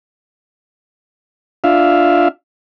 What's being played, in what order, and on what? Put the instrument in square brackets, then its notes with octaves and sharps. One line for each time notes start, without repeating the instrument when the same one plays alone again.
[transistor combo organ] D4 F4 E5 F5